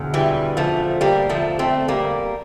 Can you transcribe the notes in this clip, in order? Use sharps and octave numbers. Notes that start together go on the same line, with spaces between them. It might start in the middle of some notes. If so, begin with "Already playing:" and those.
Already playing: E1 D2
E3 G3
F3 A3
G3 A#3
F3 A3
A3 C4
G3 A#3